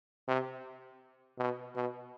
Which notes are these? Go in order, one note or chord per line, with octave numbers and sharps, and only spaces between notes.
C3
B2
B2